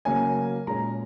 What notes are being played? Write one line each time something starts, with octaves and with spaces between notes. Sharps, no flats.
C#3 F#3 A#3 C#4 G#5
A#2 G#3 C#4 A#5